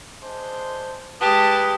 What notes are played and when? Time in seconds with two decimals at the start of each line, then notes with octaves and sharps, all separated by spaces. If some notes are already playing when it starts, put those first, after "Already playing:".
0.22 G#3 D4 C5
1.21 G#3 G4 B4 A5 D#6